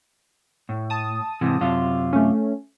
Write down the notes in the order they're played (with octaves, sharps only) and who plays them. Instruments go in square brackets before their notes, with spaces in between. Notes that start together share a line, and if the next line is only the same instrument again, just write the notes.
[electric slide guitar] A2
[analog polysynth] A5 D#6
[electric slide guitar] G#2 C3 E3
F#2 C3 F4
[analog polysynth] A3 C#4